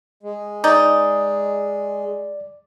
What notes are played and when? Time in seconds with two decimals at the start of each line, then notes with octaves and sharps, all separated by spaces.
0.23 G#3
0.64 D#4 D5